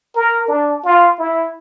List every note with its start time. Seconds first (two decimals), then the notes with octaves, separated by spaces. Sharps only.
0.16 A#4
0.48 D4
0.84 F4
1.19 E4